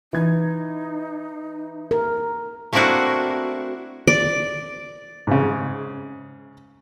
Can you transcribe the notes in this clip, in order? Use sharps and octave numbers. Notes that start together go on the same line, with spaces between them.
E3 D#4 G#6
A#4
A3 A#3 C4 D4 E4 F#4
D5
G#2 C#3